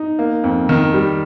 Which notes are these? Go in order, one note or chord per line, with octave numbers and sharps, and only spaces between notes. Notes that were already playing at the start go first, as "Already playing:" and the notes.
Already playing: D#4
A#3
F2
D#3
G3